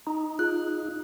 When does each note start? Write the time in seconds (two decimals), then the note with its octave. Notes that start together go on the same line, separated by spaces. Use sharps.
0.07 D#4
0.39 F4 G#4 F#6